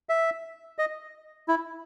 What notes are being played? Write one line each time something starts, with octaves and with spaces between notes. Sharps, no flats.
E5
D#5
E4